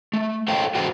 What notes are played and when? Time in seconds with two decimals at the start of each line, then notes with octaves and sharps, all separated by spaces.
0.13 A3
0.48 A4 C5 C#5 D#5 F5 G5
0.75 F#4 G#4 A4 B4 C5 G5